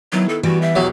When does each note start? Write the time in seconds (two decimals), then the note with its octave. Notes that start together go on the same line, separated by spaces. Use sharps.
0.12 D#3 F#3 B3 E4
0.29 A4
0.43 E3 G3 B3 F#4 D7
0.62 E5
0.75 B1 E2 F#3 G4